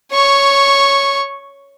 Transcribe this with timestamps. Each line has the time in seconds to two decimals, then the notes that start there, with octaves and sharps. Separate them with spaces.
0.13 C#5 C#6